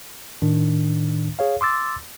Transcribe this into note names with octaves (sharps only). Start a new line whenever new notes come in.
A2 D#3 D4
G#4 C#5 F5
C6 D6 E6 A6